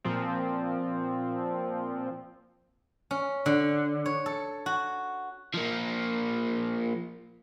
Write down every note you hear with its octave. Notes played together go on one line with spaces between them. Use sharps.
A#2 F3 C4
C#4
D3
C#5
A4
F#4
F3 A#3